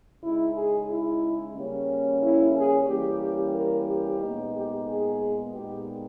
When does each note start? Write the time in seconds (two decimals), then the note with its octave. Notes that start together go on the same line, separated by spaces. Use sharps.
0.22 C#3 G#3 D#4 E4
0.55 G#4
0.88 E4
1.54 C#3 G3 A#3 C#4
2.21 E4
2.54 G#4
2.87 E3 G3 A#3 C#4 G4
3.21 G4
3.54 A#4
3.87 G4
4.21 A#2 G#3 B3 D#4
4.54 G4
4.88 G#4
5.54 A#2 G#3 B3 D#4 G4